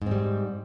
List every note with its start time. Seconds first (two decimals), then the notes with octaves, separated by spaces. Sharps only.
0.02 G#2
0.06 C4
0.11 G3